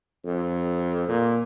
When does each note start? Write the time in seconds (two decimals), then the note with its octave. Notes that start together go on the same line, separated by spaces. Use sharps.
0.25 F2
1.08 A#2